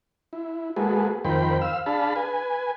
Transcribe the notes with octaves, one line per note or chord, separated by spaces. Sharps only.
E4
G#3 A#3 F#4 G#4 A4 B4
F2 D#3 A#4 C5 G5 B5
F5 E6
D4 G#4 F5 A5 B5
B4 G#5